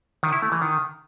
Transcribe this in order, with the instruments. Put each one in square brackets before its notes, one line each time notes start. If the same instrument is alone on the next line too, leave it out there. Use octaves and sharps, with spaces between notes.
[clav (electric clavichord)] D#3
E4
A3
E3
D#3